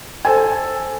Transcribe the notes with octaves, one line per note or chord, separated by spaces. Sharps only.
A4 C5 G#5